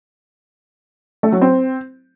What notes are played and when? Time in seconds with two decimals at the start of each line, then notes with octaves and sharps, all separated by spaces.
1.23 A3
1.32 F#3
1.42 C4